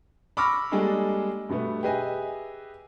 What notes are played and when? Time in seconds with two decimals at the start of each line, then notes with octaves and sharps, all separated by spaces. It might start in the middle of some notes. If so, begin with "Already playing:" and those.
0.37 B5 C#6 D6 E6 F6 A#6
0.71 G3 G#3 A#3 D4 G#4 A4
1.49 G2 B2 A3 B3
1.83 G4 G#4 B4 D#5 E5 G#5